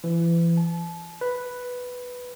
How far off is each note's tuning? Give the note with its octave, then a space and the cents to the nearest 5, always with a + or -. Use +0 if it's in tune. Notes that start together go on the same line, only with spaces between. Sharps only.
E3 +35
A5 -35
B4 +0